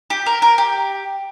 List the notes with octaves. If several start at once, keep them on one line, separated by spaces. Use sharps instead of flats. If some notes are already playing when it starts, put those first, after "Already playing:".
G4
A#4
A#4
G4